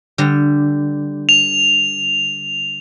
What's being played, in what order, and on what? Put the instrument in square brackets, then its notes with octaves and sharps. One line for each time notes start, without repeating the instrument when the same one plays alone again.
[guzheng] D3 G3
[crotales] F7